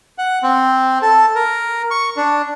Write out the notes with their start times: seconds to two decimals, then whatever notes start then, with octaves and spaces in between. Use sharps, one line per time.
0.18 F#5
0.43 C4
1.02 A4
1.35 A#4
1.91 C#6
2.17 D4